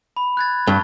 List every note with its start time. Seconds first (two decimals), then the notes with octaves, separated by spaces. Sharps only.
0.17 B5
0.37 F#6 G#6 A6
0.67 G2 A5 C#6 A6